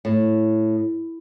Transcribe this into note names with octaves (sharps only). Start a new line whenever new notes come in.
A2